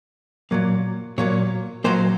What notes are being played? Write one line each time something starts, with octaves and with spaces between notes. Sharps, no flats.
A#2 F#3 A#3
A#2 F#3 A#3 C#5
A#2 F#3 A#3 C5